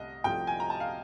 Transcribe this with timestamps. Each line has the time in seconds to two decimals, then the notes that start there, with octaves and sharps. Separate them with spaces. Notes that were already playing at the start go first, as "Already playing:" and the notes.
Already playing: C2 C3 A3 D#5
0.24 C2 C3 F3 A3 G5
0.47 G#5
0.60 A#5
0.70 A5
0.80 F5